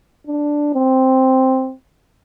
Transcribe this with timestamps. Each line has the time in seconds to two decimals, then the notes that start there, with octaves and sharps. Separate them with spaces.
0.27 D4
0.74 C4